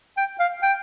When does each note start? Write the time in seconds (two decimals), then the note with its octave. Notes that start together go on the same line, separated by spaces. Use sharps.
0.17 G5
0.40 F5
0.63 G5